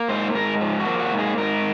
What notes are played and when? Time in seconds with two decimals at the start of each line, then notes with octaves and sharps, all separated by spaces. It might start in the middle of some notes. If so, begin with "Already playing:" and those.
Already playing: A#3
0.08 G#2 C5
0.34 G#2 A#4
0.61 F3
0.80 F#4
0.86 A#3
1.00 F#4
1.12 G#2
1.19 G#4
1.37 G#2 A#4